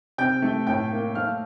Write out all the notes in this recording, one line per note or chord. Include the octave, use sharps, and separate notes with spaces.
C3 G5 G6
A3
A2 G5 G6
A#3
A3 F5 F6